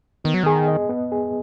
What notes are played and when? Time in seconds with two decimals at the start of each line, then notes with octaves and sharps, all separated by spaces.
0.24 D#3 B3
0.34 F#3
0.43 D#3 G#4
0.68 D#5
0.89 B3
1.12 G#4